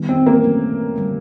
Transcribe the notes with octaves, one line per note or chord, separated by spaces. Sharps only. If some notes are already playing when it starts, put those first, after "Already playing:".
Already playing: D#3 G3 B3
C4
A#3
F#3 A3 C#4
D3 G3 A#3